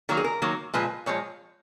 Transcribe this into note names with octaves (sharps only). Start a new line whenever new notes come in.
D#3 F#3 A#3 A#4
G#4
A#4
D#3 F#3 A#3
A#2 F3 G#3 B4
A#2 F3 G#3 C#5